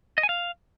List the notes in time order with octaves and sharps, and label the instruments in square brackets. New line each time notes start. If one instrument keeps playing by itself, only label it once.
[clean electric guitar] D#5
G#5
F5